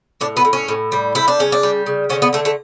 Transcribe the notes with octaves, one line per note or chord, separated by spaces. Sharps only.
A2 D4
B3
A2
C#4
A2
G3
G3 E4
D4
C#3 C#4
D4
G3
C#3
D3 C#4
B3
D3 A3
A3